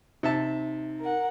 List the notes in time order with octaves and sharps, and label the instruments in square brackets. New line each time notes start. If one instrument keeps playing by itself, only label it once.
[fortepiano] C3 E5 A5 [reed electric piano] D#4
[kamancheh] A#4 F#5